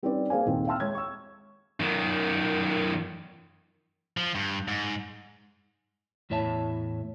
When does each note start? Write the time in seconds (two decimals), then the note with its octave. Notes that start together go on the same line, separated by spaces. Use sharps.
0.03 G3 C4 C#4 D#4 B4 D5
0.30 A#3 G#4 C5 F5 G#5
0.46 D#1 D#3 C4
0.67 E5 G5 A5 C6 E6 F6
0.80 G#3 C#5 G#6
0.95 C#6 E6
1.80 F#2 D#3
4.17 F3
4.35 G2
4.68 G#2
6.30 E2 A2 E4 C#5 E5 A5